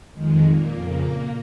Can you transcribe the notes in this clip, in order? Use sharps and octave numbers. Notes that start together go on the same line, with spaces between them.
F2 D#3 G#3
A#2 A#3
F2 C#3 A#3 F5
A#2 A#3 A#5